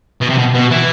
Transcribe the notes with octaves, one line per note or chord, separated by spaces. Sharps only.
B2
C3
B2
B2
E3